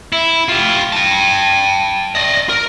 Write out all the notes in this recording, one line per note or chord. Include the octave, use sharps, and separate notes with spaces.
E4
F4 G4
G5 A5
D5 D#5
A#4